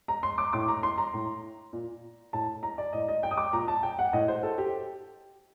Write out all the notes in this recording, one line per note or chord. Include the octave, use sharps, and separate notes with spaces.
A#5
C6
D6
A2 D6
A#5
C6
A#5
A2
A#2
A2 A5
A#5
D5
A2 D#5
D#5
G5
D#6
D6
A#2 A#5
A5
G5
F#5
A2 D#5
C5
A4
G4